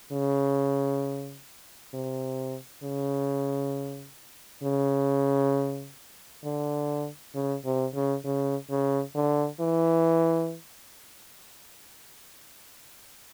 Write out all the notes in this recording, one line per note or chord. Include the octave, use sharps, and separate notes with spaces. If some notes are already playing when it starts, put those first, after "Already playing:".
C#3
C3
C#3
C#3
D3
C#3
C3
C#3
C#3
C#3
D3
E3